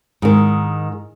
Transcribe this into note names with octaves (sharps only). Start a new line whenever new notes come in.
G#2 D#3